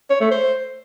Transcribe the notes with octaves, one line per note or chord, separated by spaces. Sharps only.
C#5
A3
C5